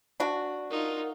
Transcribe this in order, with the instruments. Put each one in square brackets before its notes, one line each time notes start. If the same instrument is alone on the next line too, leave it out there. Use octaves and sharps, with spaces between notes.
[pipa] D4 F#4
[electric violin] D#4 F4 [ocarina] A#4